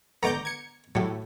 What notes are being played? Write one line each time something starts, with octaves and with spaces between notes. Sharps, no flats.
D3 A3 B3 A#5 D6 G6
G#6 C#7
A2 F#3 G4